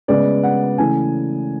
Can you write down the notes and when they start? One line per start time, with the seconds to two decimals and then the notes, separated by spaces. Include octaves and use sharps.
0.08 C#3 G#3 B3 D5
0.43 F#5
0.78 C#3 E3 A3 G#5